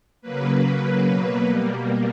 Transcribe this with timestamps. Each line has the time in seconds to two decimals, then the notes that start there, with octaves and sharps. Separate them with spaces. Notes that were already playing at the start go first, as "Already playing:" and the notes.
0.22 C#3 F#3 A#3 B4
0.63 C#3 F#3 A#3 B4
1.04 B2 F#3 A#3 B4
1.46 B2 G3 A#3